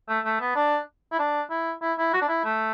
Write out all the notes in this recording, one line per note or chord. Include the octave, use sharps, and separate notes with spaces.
A3
A3
B3
D4
E4
D4
E4
E4
E4
F#4
D4
E4
A3